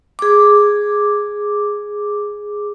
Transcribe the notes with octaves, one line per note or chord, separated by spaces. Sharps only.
G#4 D6